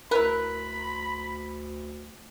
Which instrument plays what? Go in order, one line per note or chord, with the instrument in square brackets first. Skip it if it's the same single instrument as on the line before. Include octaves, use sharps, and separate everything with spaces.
[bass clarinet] D2 [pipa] E4 B4 [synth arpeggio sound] A#4 [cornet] B5